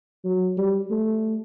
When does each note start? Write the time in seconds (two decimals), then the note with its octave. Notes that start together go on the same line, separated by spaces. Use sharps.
0.24 F#3
0.57 G3
0.91 A3